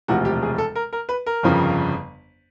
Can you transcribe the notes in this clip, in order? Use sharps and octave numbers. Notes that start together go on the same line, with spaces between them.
E1 D2 C3 F3 F#4
G4
G#4
A4
A#4
A#4
B4
A#4
G1 F2 C#3 F3